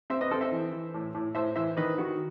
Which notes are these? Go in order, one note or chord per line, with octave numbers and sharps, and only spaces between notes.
C4 C5 E5
B4 D#5
C4 A4 C5
C5 E5
E3
E3
A2
A2
A2 C5 E5
E3 C5 E5
D#3 B4 D#5
D#3 F#4